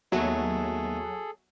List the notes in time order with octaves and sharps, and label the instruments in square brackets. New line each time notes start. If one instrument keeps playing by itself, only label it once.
[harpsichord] D#2 A3 B3 [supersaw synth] F#3 [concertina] G#4 A4